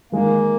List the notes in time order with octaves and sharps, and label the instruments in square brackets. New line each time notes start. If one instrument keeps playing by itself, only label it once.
[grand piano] D#3 G#3 [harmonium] A#3